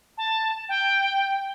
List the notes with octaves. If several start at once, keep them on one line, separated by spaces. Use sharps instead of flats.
A5
G5